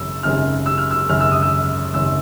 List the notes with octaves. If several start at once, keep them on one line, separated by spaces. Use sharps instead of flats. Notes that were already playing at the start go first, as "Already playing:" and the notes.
Already playing: G#1 F#2 C#3 E6
G#1 F#2 C#3 F6
E6
F6
E6
G#1 F#2 C#3 F6
E6
D#6
E6
G#1 F#2 C#3 E6